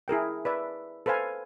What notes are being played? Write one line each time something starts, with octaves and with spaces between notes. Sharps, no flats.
E4 G#4 A#4 G5
B4 D5 E5
A4 B4 C5 F5 G#5